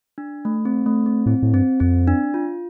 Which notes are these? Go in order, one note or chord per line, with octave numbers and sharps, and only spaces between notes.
D4
A3
C4
A3
C4
A2 C4
A2
G2 C4
F2 C4
D4
F4